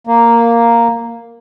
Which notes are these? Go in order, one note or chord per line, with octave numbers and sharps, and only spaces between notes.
A#3